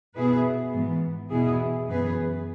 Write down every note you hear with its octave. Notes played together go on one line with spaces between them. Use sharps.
B2 B3 E4 G#4 B4
G#2 E3 B3
E2 B2 B3 E4 G#4
F#2 E3 B3 G#4 B4